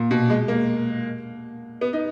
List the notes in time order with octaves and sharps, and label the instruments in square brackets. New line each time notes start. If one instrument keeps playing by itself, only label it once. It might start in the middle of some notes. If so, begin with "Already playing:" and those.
Already playing: [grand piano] A#2
B2
G#3
A#3
B3
D#4